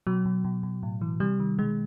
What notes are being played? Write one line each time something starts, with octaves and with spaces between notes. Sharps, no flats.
B2 F#3
B2
B2
B2
A2
E3
C3 G3
D#3
B2 G#3